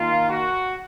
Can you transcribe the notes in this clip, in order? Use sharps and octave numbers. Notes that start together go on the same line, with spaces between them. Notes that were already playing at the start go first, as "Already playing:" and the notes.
Already playing: D#3 A#3 F4
F#4